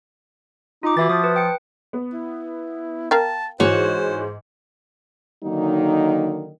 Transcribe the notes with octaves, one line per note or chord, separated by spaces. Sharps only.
D#4 F4 D6
E3 F#4 E5 A6
F3 D#6
B4
G5 C#7
B3
E4
A#4 F5 G5 A5
G#2 E3 F#4 C5 C#5
D3 D#3 F#3 A#3 D#4